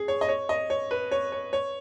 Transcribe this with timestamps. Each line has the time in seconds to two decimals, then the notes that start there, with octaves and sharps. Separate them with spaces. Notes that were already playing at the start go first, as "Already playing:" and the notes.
Already playing: G#4
0.08 C#5
0.21 D#5
0.29 C#5
0.49 D#5
0.70 C#5
0.91 B4
1.11 C#5
1.32 C#5
1.53 C#5